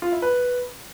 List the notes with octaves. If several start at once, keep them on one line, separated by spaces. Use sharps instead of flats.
F4
E4
B4